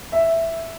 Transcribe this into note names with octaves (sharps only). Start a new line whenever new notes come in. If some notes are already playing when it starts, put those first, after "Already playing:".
E5